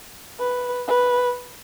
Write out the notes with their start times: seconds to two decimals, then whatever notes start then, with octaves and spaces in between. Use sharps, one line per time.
0.40 B4
0.88 B4